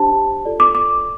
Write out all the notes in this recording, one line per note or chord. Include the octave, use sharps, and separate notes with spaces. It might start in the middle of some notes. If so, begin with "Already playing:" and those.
Already playing: D4 G4 C5 A5
F4 A4 D5
D6
D6